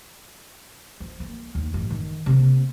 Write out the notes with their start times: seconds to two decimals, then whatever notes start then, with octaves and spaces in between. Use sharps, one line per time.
1.00 F3
1.20 A#3
1.55 D#2
1.74 A1 F#2
1.90 D#3
2.26 C3 A#3